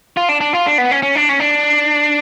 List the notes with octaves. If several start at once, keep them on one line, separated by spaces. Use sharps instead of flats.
F4
D4
D4
F4
D4
B3
C#4
C#4
D4
C#4
D4